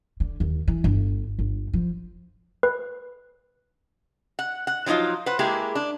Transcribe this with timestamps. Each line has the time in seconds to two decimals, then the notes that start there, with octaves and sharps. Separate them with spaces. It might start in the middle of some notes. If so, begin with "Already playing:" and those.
0.20 D3
0.40 D#2
0.68 E3
0.84 G1
1.39 G1
1.73 F3
2.63 B4
4.39 F#5
4.67 F#5
4.86 F3 F#3 B3 D#4 F4
5.26 B4 C5 F#5
5.39 G#3 A#3 E4 G4 G#4
5.75 D4